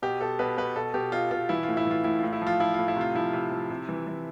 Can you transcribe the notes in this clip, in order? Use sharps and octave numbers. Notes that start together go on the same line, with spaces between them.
B2 G4
B2 A4
B2 B4
B2 B4
B2 A4
B2 G4
B2 F4
B2 F4
E3 E4
A2 F4
E4
E3 F4
A2 E4
A2 F4
E4
F3
F4
F3 E4
A2 F4
E4
C3 F4
F3 E4
C3
F3
C3
E3
E3